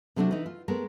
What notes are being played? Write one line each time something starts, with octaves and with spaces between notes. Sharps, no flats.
C3 F#3 A3 C#4 D4 F#4
E3 D#4
F4
G#3 A3 B3 A#4